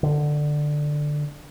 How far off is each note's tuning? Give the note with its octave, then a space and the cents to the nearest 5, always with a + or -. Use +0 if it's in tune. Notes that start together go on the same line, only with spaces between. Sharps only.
D3 +10